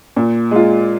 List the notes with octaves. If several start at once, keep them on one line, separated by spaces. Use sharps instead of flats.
A#2
G#3 F4